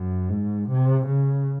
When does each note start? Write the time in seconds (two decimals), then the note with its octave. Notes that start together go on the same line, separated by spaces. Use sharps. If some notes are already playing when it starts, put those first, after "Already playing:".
Already playing: F#2
0.29 G#2
0.69 C3
1.07 C#3